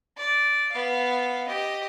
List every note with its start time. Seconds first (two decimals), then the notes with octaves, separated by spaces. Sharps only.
0.17 D5
0.72 B3 F5
1.47 G4 D#5